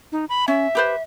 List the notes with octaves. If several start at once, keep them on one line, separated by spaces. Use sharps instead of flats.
D#4
B5
C#4 E5
G4 B4 C5